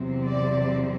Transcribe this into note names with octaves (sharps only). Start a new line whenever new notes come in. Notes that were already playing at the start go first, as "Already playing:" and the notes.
Already playing: E2 C3 F#3 C4
D5